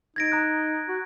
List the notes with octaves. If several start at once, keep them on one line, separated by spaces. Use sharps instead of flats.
D#4 G#6 A#6 D7
A#5 D#6 F#6
F#4